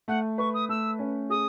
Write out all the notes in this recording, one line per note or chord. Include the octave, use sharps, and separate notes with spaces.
A3 F#5
B4 C#6
D#6
A3 E6
C#4
G#4 D#6